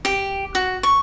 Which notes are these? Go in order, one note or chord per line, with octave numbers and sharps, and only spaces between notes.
G4
F#4
C#6